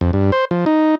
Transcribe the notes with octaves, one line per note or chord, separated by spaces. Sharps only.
F2
G2
C5
F3
D#4